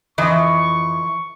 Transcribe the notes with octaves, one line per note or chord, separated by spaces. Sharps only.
F2 E3 D#5 C#6